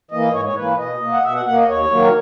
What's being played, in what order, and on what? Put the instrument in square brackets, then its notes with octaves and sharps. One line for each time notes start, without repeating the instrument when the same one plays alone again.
[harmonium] E3 A#3 D#5
G#2 C#5
C#5
E3 A#3 B4
B2 D#5
A#3
F#5
B2 E5
F#5
A#3 F#5
D#5
D#2 C#5
D#3 F#3 A#3
A#4